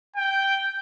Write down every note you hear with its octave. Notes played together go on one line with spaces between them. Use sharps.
G5